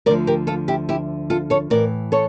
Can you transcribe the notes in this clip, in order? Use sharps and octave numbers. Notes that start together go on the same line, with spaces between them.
D2 D3 F3 A#4 D5
G4 A#4
F4 A4
E4 G4
E4 G4
F4 A4
A4 C#5
A2 E3 A#4 D5
A4 C#5